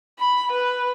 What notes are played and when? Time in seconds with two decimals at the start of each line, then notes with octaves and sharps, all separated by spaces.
0.19 B5
0.51 B4